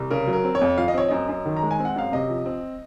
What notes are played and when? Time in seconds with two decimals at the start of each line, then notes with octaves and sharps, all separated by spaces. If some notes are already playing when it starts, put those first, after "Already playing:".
Already playing: C2
0.11 C#3 A#4
0.27 F#3
0.33 A#4
0.44 C4
0.55 C#5
0.61 F2
0.78 F3 F5
0.88 D#5
0.94 C4 C#5
1.08 F#2 D#5
1.29 F#2
1.45 D#3
1.57 A#5
1.62 G#3
1.71 G#5
1.79 C4
1.85 F#5
1.96 F#2 F5
2.12 C3 D#5
2.29 F3
2.46 C4